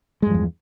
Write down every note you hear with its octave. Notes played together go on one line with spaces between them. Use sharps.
E2 G2 F3 G#3